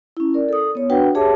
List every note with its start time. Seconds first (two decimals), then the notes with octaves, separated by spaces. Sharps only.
0.17 C#4 E4
0.34 A#4 D5
0.49 A4 D#6
0.75 B3 C#5
0.90 D4 F#4 B4 F#5 G5
1.15 G4 G#4 C#5 E5 A5 D6